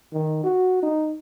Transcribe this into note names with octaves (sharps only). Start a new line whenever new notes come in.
D#3
F#4
D#4